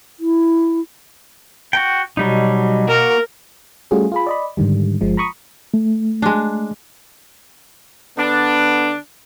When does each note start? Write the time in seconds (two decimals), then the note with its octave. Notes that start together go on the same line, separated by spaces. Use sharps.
0.20 E4
1.73 F#4 G5
2.17 B2 F#3 G3 D#4
2.88 A#3 F#4 A#4
3.91 G3 A3 C#4 F4 F#4 G#4
4.12 F4 G#4 B5
4.27 D5 D#5 B5
4.57 G#2 D3 D#3 G3
5.01 G1 F3 G#3
5.17 A#5 B5 C#6 D#6
5.74 A3
6.22 G#3 D4
8.18 D3 B3 D4